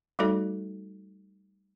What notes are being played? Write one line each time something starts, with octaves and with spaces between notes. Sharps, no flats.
G3 A3 D#4 F#4 A4 D5